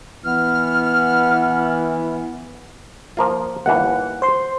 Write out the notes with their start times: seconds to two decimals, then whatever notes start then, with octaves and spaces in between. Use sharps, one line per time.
0.25 E3 B3 F6
3.17 F3 A#3 F4
3.66 G1 D#2 E3 F#5
4.22 C5 C6